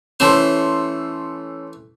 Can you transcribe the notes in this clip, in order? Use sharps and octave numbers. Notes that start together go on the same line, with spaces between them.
E3 A3 C#4 A4 C5 C6